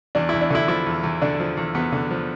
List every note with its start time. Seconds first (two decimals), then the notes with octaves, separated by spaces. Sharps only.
0.15 E2 D4
0.29 E2 E4
0.41 D4
0.50 D3 E4
0.68 F3 E4
0.86 E2
1.04 E2
1.22 D3 D4
1.40 F3
1.57 E2
1.74 E2 B3
1.92 D3
2.11 F3